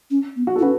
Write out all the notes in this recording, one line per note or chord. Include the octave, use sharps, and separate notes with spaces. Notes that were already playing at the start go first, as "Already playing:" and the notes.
C#4
B3
F#4
A4
E4
C#4 F#4 B4